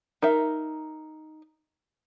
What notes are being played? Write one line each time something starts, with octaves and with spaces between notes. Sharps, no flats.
D#4 A#4 E5